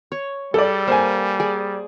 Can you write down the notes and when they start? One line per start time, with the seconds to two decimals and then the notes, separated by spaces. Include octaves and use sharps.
0.12 C#5
0.54 G3 G#4 A4 D5
0.87 A#3 A4 C5 G#5
1.40 G#4 D5